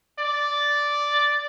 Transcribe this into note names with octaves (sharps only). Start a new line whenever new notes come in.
D5